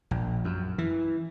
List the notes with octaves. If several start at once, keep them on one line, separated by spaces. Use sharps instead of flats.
A#1
F#2
E3